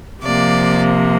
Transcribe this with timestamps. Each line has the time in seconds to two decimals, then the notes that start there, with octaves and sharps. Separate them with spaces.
0.23 C3 F3 A#3 D5